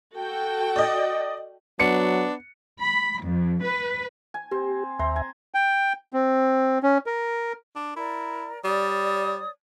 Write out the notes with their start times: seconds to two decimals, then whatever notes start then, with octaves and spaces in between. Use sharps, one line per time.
0.16 F#4 A4 G5
0.76 D5 D#5
1.80 F#3 B3 D4 C#7
2.79 B5
3.23 F2
3.61 B4
4.34 G#5
4.51 C4 G4
4.99 D#2 C5 E5 A#5
5.16 G#5
5.54 G5
6.13 C4
6.83 C#4
7.06 A#4
7.75 D4
7.96 E4 A#4 D5
8.64 G3 C#5 D5 D#6